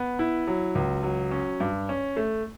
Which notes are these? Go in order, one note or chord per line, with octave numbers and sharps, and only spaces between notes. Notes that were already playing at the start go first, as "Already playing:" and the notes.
Already playing: B3
E4
F#3
C#2
F#3
C#4
G2
C#4
A3